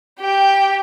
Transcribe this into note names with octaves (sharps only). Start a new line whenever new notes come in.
G4 G5